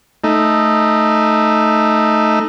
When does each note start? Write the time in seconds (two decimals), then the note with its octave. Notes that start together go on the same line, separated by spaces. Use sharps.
0.24 A3 D#4